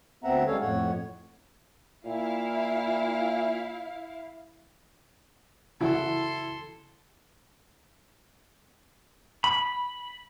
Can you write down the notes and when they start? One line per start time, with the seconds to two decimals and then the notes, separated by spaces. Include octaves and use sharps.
0.24 D2 B3 C4 E5 F#5 A#5
0.47 G3 G#3 C#4 A4 C#5 F5
0.61 F2 A2 C#5 F#5
2.07 A#2 E4 F5
5.81 C#3 E3 E4 F#4 A4 C6
9.44 B5